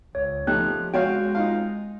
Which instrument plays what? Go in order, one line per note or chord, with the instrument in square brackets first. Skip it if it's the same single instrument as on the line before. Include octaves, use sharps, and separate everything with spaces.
[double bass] C#2 [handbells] C#5
[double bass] F3 [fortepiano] A3 D#4 G4 [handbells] F#6
[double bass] G#3 [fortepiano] F#4 C#5 F5 [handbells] G5
[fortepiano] D#4 F4 F5